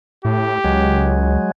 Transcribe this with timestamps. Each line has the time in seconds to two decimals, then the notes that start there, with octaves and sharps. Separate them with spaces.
0.25 A2 G4
0.64 C#2 F#3 G#3